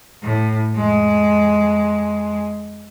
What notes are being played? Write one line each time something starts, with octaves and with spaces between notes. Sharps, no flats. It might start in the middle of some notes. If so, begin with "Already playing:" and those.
A2
F2 G#3